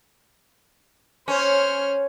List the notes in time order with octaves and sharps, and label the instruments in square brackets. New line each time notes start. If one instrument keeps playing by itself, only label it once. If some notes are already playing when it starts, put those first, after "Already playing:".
[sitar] C#4 [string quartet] C5 C#5 F6